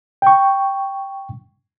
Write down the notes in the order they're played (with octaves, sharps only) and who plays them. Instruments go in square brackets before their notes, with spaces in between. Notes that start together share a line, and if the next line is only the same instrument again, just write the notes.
[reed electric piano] G5 C#6